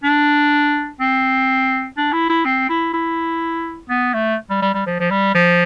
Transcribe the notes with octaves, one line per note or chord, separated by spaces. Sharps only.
D4
C4
D4
E4
E4
C4
E4
E4
B3
A3
G3
G3
G3
F3
F3
G3
F3